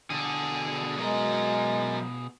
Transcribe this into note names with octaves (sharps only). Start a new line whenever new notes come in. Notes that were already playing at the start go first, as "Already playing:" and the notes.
B2 D3 G#4
F#3 G#3 A#4